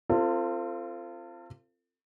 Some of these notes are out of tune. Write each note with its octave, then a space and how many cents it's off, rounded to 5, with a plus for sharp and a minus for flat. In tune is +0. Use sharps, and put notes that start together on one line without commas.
C4 +0 F4 -25 A4 +35